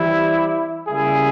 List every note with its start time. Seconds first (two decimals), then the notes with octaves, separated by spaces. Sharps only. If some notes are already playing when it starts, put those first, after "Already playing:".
Already playing: E3 G3 C4 E4 G4
0.87 C#3 G3 A#3 E4 G#4